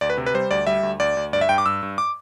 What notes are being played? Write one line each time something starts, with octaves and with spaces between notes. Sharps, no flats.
D2 D5
B4
C3
B4
G3 C5
D2 D5
G3 E5
D2
D2 D5
D2
G2 D5
E5
G2 G5
D6
G2 E6
G2
D6